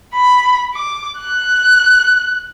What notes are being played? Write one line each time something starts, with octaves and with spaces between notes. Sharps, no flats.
B5
D6
F#6